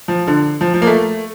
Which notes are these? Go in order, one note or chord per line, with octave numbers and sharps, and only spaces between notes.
F3
D3
F3
F3
A#3
A3